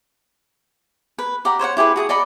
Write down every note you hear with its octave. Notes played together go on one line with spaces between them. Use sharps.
B4
G4 D5 F#5 A#5
C5 C#5 F5 F#5
E4 G4 G#4 B4
F#4 G#4 G#5 D#6
D5 D#5 F#5 B5